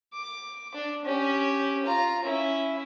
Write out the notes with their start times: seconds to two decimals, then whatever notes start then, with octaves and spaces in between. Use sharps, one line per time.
0.14 D6
0.75 D4
1.05 C#4 G4
1.85 F4 A#5
2.23 C#4 E4